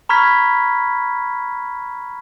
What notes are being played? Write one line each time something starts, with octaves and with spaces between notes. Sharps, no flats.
A#5 B5 C#6 F6 G#6 B6